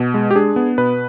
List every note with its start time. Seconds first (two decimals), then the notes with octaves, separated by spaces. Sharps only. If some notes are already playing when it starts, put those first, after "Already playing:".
Already playing: B2
0.14 G#3
0.31 G4
0.35 D4 G#4
0.56 B3
0.78 B2 B4